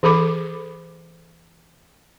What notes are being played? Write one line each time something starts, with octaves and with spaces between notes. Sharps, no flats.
E3 G#4 A4 B5 D6